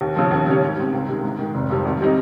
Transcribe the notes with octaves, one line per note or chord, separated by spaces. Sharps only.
D#2
C#3 F3
D#2
C#3 G3 C#4
G#2
G3 C4
C#2
C3 D#3 G#3
G#2
D#3 G#3
F1
F2 C3 G3
G#1
G3 C4 D#4